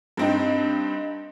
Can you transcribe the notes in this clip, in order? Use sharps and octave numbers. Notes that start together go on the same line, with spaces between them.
G2 C4 D#4